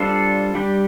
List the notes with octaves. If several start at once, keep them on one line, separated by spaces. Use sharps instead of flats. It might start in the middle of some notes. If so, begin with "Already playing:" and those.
Already playing: G3 D4 F4 A4 C5
G3 D4 G4